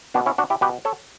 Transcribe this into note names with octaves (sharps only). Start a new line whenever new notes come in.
B2 B3 D4
C#4 E4
D4 F#4
E4 G4
B2 G4 B4
A4 C#5